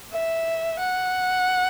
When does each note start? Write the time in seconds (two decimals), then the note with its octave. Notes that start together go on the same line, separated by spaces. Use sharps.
0.12 E5
0.80 F#5